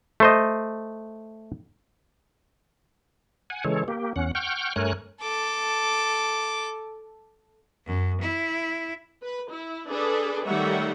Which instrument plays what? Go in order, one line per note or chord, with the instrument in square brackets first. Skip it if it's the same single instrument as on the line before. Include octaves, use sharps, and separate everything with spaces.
[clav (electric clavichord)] A3 C5 D#5
[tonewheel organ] F#5 G#5
C#3 E3 G#3 A4 C#5
A#3 G4
E2 C#4 F#5
F#5 G5 C#6 F6 G6
G2 A3 A#4 C#5 G#5 F#6
[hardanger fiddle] A4 D6
[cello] F#2
E4
[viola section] B4
E4
D4 G#4 A4 B4 D5
D#3 G3 A3 C#5 E5 F#5